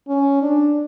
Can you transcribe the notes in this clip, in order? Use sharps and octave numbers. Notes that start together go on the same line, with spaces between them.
C#4
D4